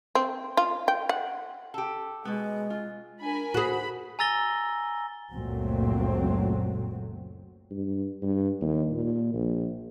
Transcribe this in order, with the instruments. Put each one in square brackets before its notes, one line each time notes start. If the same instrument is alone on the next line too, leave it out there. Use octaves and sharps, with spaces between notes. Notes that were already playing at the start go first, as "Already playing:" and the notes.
[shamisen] C4
F4
G5
F#5
[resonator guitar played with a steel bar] G4 A4
[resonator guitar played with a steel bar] B2 B3 [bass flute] G#3
[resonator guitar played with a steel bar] F4
[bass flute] D4 [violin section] A#4 G#5 B5
[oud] F#4 G#4 [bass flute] C5 [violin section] B5
[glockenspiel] G#5 A#5 E6 A6 A#6 G7
[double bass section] F#1 C#2 A#2 F#3 A3 C4
[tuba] G2
G2
D#2
A#2
A#1